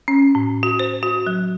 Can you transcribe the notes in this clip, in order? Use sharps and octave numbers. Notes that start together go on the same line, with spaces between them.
C#4
A2
F#4
C5
F#4
F#3